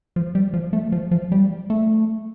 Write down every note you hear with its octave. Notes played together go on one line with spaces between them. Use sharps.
F3
G3
F3
A3
F3
F3
G3
A3